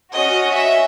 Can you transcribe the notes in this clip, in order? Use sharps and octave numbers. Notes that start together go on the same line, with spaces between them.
C#4 F#4 D#5
E5